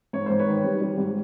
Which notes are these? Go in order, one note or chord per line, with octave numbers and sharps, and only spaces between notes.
G#2 C#5
G#2 C5
B4 C#5
D#3
G3
G3
G#2